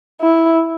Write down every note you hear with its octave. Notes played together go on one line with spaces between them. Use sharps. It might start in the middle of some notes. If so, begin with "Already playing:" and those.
E4